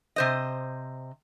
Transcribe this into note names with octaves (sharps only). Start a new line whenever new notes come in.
C3 C5 D#5